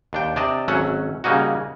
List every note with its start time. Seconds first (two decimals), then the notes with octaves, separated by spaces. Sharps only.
0.13 D#2 D4 G5
0.36 C3 D4 D5 D#5 A5
0.68 G#1 F#3 A3 C#4 A4 F#5
1.24 C#3 G3 A#3 C#4 D#4 F#4